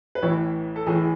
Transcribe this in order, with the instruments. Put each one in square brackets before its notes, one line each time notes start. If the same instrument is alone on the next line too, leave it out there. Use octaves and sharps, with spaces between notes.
[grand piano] B4
A1 A2 E3 C#5
A4
A1 A2 E3 G#4